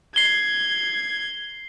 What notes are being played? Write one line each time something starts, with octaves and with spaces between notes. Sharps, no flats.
G#6 C7 G7